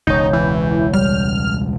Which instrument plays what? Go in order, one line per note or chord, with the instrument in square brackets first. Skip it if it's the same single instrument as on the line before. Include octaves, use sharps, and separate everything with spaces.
[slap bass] E1 C#2 [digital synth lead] D#4 [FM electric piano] C#5 G6
[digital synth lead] E3
[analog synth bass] G3 [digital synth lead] F6